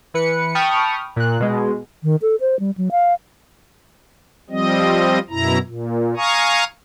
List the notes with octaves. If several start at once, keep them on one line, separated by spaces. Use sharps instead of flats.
E3 B4 C#7
G5 A5 B5 C#6 D#6 F6
A#2 F#6
B2 G#3
D#3
A4
C5
G3
F#3
F5
F3 G3 C4 D#5
F#2 B2 E4 A#5
A#2
F5 G#5 A#5 C#6 D#6